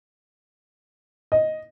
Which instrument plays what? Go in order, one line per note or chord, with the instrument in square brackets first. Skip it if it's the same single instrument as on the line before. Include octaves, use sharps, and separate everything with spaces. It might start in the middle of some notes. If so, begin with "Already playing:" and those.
[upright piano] D#5